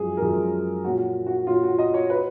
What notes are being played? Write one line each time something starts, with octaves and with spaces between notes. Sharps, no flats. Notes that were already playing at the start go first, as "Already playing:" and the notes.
Already playing: F#2 F3 G#3 G#4
A#4
F#2 F3 G#3 G#4
A#2 F#3 F#4
F#4
A#2 F#3 F4
F#4
D#5
C#5
F#3 B4